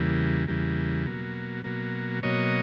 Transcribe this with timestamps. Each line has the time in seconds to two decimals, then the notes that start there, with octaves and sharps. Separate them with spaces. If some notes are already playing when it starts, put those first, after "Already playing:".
Already playing: E2 C#3 E3 G3 A#3
0.47 E2 C#3 E3 G3 A#3
1.06 B2 F#3 A#3
1.64 B2 F#3 A#3
2.23 B2 F#3 A#3 C#5 D#5